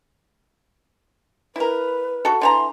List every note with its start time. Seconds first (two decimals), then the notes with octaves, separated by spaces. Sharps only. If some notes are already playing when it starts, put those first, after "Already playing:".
1.56 E4 A#4 B4
2.25 F#4 A4
2.41 D3 E3 A#5 C6